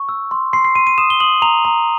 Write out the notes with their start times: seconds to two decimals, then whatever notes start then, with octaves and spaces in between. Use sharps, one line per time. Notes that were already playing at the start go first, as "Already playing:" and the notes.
Already playing: C#6
0.09 E6
0.31 C6
0.53 C6 C7
0.65 C7
0.75 C6 D#7
0.87 D#7
0.98 D#6 E7
1.10 G7
1.20 D#6 F#7
1.42 A#5 F7
1.65 A#5